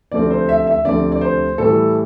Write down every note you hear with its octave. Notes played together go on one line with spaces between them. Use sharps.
D2 C3 F3 A3 C4 D5
C5
E5
E5
D2 C3 F3 A3 C4 D5
D5
C5
A2 E3 G3 A4